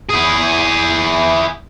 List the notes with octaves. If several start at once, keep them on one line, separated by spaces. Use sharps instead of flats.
E4 G#4